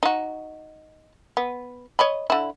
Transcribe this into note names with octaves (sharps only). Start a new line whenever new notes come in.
D#4 F#4
B3
C#5 D#5 B5
D3 E4